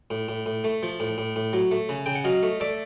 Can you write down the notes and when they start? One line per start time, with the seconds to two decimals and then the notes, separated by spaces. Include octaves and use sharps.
0.11 A2
0.28 A2
0.46 A2
0.64 A3
0.83 F3
1.00 A2
1.18 A2
1.36 A2
1.53 F#3
1.71 A3
1.89 C#3
2.06 C#3 G5
2.15 F#5
2.24 F#3 D#5 F5
2.43 A3
2.60 A3 D5 E5